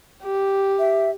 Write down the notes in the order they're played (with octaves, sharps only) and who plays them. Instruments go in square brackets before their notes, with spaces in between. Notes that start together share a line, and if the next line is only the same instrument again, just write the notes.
[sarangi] G4
[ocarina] E5